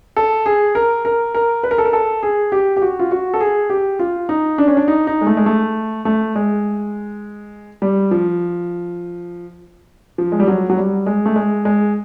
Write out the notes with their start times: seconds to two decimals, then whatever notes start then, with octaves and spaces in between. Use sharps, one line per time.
0.16 A4
0.46 G#4
0.75 A#4
1.05 A#4
1.35 A#4
1.63 B4
1.71 A#4
1.78 A4
1.85 A#4
1.93 A4
2.23 G#4
2.52 G4
2.77 G4
2.82 F#4
2.99 F4
3.11 F#4
3.34 A4
3.41 G#4
3.70 G4
3.99 F4
4.29 D#4
4.58 D4
4.68 C#4
4.77 D4
4.88 D#4
5.07 D#4
5.21 G#3
5.27 A3
5.37 G#3
5.46 A3
6.05 A3
6.36 G#3
7.82 G3
8.11 F3
10.18 F3
10.32 G#3
10.40 G3
10.48 F#3
10.70 F#3
10.77 G3
11.06 G#3
11.26 A3
11.36 G#3
11.65 G#3